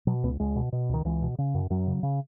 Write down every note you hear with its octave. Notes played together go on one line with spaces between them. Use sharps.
B2 F#3
C#2 B3
C#2 G#3
B2
B2
C#2 D#3
C#2 E3
B2
C#3
F#2
F#2 F#3
C#3
C#3